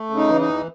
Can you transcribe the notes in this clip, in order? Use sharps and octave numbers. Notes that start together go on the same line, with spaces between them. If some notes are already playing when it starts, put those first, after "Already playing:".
Already playing: A3
C#3
D#4
E3
D#4
E2